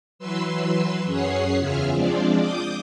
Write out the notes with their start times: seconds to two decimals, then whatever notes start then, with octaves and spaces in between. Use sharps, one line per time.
0.19 E3 F#3 B4 C6 E6
1.05 F#2 C#4 G#4 C#5 F#5 C7
1.57 E2 C#3 F4 G#4 E5 F6
1.93 F3 G#3 C4 D4 F4 D5
2.39 D6 D#6 G6